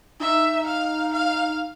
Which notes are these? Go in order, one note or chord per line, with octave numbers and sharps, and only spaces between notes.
D#4 E5
F5
F5